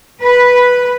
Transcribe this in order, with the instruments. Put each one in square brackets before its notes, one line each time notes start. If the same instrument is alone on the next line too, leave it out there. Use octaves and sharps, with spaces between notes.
[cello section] B4